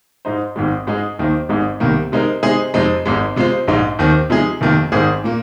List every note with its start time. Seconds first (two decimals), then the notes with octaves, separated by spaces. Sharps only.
0.25 G#2 G#3 D#4 C5
0.56 G#1 G#2 D#3 G#3
0.87 G#2 G#3 D#4 G#4
1.19 D#2 D#3 A#3 D#4 C5
1.49 G#1 G#2 G#3 D#4
1.80 C2 C3 D#3 A#3
2.12 C3 G#3 C4 D#4 A#4
2.43 C3 G#3 D#4 G#4 C5
2.74 F2 C3 G#3 C4 D#4
3.06 G#1 G#2 G#3
3.36 C3 G#3 F4 C5
3.67 A#1 G#2 G#3 D#4
3.99 D#2 D#3 C4
4.30 C3 F3 G#3 D#4 G#4
4.61 F1 F2 D#3 A#3
4.92 G#1 G#2 D#3 C4 G#4
5.24 A#2 A#3